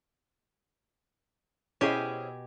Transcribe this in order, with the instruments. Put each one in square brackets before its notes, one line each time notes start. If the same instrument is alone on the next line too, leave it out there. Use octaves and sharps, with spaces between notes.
[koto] B2 G4 G#5 [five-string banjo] C#4 C5 [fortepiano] E4 G#4 D#5